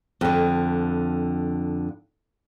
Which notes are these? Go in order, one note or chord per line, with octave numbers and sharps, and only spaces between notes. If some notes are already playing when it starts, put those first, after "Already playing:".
F2 D3